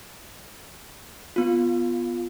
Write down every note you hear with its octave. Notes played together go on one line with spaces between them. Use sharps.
B3 F4